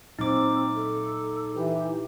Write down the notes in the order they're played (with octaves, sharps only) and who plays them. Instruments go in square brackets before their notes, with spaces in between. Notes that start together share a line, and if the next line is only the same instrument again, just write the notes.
[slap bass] A#2 F#3 [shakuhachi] C4 [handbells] D#4 D6
[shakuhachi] A4
[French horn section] E3 [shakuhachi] G4